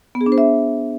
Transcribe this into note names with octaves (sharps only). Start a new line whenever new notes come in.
B3
G#4
D4
C5
E5